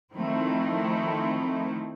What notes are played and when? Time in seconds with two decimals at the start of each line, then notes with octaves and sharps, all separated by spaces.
0.13 D#3 F3 A3 C4 E4